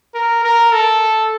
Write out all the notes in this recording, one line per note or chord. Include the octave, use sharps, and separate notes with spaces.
A#4
A#4
A4